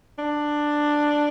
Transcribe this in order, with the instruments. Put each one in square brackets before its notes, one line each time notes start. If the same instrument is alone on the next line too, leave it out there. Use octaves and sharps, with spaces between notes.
[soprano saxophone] D4